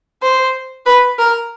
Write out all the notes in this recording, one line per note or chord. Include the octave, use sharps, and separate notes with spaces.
C5
B4
A#4